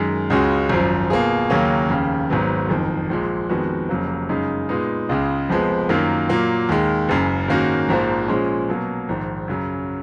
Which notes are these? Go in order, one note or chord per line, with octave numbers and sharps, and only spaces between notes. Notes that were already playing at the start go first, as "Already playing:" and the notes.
Already playing: F#2 D#3 G#3
C#2 C#3 G#3 C#4 F#4
G#1 F#2 F3
B2 A#3 F4 G#4
D#2 C#3 F#3 A#3 C#4
F1 D#2 C#3
G#1 G#2 F#3 B3
F#1 F2 D#3
A#1 A#2 G#3
F2 D#3 G#3 B3 F#4
F1 F2 C#3 F#3 A#3
F#2 C#3 G#3 D#4
A#2 G#3 B3 D#4
C#2 C#3 G#3
F1 F2 F3 G#3 B3
F#2 D#3 F#3 A#3 F4
A#2 F#3 A#3
D#2 D#3 G#3
F#1 F#2 C#3
G#2 D#3 A#3 C#4 F#4
A#1 G#2 F3 A#3
A#2 F3 G#3 C#4
B2 F#3 A#3
A#1 G#2 D#3
F#2 C#3 F#3